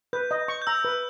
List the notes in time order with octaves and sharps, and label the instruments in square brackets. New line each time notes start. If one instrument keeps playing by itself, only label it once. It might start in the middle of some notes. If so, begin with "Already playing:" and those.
[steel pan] B4 [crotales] G6
[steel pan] D#5
C#6
[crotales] G6
[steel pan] A#5 [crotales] E6
[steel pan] B4